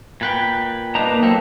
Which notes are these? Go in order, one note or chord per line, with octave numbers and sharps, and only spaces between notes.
A#2 B4 G5
A#3 D4 D#4 B4 A#5
F#3 A#3 C4 A4